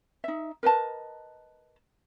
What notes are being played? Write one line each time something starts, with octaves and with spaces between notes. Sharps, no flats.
D#4 E5
A#4 B4 D#5 A5